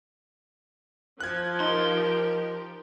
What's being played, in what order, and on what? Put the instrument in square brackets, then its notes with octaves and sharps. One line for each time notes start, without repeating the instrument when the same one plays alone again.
[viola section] F3 [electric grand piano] F#6 G#6
[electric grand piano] D#4 [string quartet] G4 A#4 [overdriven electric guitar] C6